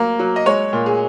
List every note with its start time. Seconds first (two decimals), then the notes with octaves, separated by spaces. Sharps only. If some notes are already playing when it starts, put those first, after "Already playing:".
Already playing: F#3 A#3
0.19 F#3
0.36 D#5
0.46 G#3 C#5
0.73 A#2
0.86 G#4